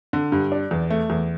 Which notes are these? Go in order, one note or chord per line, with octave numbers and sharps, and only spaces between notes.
D3
G2
D4
E2
A3
E2